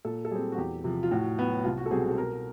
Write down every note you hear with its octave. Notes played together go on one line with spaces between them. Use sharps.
A#2 A4
A4
G3 C4 G#4
F#4
E2 G4
C3 F3
F4
A2 F#4
F#3 B3
C2 F4
F#4
A4
B2 G3 C4 G#4
A4
B2 A#4